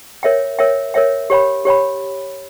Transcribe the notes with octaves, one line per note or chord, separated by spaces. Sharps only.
A#4 C#5 E5 G5
A#4 C#5 E5 G5
A#4 C#5 E5 G5
G4 C#5 G5 B5
G4 C#5 G5 B5